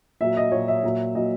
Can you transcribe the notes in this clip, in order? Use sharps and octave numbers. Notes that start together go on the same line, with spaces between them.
A#2 F#3 E5
D#5
A#2 F#3 C#5
E5
A#2 F#3
A#2 F#3 D#5